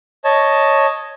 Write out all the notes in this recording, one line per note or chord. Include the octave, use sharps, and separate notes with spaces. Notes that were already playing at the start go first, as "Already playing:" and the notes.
C#5 D#5 A5